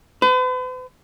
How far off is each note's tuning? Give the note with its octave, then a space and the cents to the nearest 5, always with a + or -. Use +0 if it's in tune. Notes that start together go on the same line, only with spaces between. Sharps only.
B4 +45